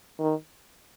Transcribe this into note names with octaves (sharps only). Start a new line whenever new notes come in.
D#3